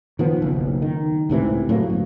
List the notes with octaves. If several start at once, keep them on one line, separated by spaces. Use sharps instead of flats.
D#3 F3 B3
F#1 B1
D#3
C#2 A2 C3 E3
A2 F#3 G#3 A#3
G1 F#2